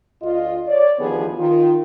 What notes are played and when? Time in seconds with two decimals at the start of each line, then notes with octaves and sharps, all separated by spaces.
0.22 D2 F4 D#5
0.68 C#5 D5
0.99 D2 D#3 F3 B3 G4 G#4
1.38 D#3 F4